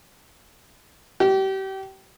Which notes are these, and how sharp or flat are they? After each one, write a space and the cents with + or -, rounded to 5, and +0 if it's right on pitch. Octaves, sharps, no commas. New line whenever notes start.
G4 -30